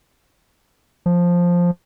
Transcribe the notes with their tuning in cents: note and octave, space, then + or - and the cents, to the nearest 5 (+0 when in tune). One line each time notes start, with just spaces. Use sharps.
F3 +5